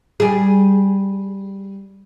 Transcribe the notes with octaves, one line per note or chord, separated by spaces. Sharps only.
G3 G#4